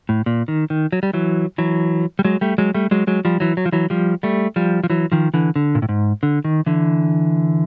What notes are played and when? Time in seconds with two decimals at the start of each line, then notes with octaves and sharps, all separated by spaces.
0.09 A2
0.26 A#2
0.48 D#3
0.70 D#3
0.92 F#3
1.03 G3
1.13 E3 F#3
1.58 E3 F#3
2.19 G3
2.25 F#3 G#3
2.41 G3 A3
2.58 F#3 G#3
2.74 G3 A3
2.91 F#3 G#3
3.07 F#3 G#3
3.25 F3 G3
3.40 E3 F#3
3.57 F#3
3.66 F3
3.72 E3 F#3
3.90 F3 G3
4.23 G3 A3
4.56 F3 G3
4.84 F3
4.90 E3 F#3
5.12 D#3 F3
5.34 D3 E3
5.56 D3
5.75 A#2
5.82 A2
5.89 G#2
6.23 D3
6.44 D#3
6.66 D3 E3